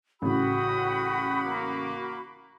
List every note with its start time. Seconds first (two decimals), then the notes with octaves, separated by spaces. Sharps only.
0.22 A1 C#3 F#4 G4 G5 B5 D#6
1.44 A#3 D6